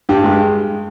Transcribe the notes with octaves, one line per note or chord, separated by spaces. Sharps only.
G2 G4
G#3